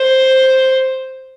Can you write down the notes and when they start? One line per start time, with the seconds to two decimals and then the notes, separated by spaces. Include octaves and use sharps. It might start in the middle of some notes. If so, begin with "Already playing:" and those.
Already playing: C5